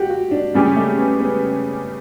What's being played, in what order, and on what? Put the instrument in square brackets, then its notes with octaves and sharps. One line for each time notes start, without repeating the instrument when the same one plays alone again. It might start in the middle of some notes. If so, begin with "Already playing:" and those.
Already playing: [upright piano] F#4 G4
F#4
D4
[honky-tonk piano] C#3 G3 C#4 G4
[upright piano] A3
B3
B3